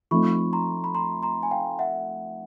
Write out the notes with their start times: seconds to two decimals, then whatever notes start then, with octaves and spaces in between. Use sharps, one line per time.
0.11 F3 A3 C4 D#4 B5 C#6
0.53 A#5 C6
0.84 B5
0.94 A#5 C6
1.23 A#5 C6
1.43 G#5
1.51 F5 G5
1.79 E5 F#5